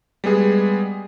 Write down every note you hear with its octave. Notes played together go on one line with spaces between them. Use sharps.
G3 G#3 B3 G#4